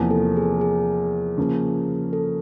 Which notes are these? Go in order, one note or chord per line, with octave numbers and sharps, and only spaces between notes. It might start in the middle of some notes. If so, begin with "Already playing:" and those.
Already playing: E2 C3 F3 A#3
A4
G#4
G#4
C#3 F3 A#3
A4